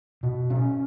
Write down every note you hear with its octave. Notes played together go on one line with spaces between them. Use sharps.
B2
C#4